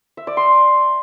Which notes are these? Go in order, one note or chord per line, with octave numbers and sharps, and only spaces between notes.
E5
D5
C6